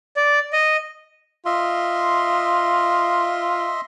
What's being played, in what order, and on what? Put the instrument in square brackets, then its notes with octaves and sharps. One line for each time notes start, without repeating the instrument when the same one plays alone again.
[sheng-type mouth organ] D5
D#5
[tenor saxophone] F4 [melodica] D#5 E5 C6